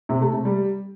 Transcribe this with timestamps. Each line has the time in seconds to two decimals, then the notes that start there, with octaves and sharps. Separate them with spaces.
0.09 C3
0.21 A3
0.33 C3
0.45 G3